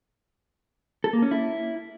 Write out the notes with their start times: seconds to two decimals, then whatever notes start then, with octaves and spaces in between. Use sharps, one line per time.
1.04 A4
1.13 A#3
1.22 C#4
1.31 E4